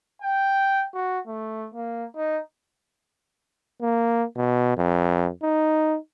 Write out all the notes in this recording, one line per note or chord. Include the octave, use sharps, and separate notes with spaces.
G5
F#4
A3
A#3
D#4
A#3
B2
F2
D#4